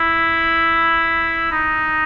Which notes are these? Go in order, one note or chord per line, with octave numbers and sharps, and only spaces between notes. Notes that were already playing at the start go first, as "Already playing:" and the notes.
Already playing: E4
D#4